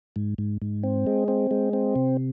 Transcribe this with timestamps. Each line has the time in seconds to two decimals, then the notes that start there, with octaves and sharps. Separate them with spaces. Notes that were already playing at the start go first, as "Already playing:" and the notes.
0.16 G#2
0.38 G#2
0.62 G#2
0.83 C4
1.07 G#3
1.28 C4
1.51 G#3
1.73 C4
1.96 C3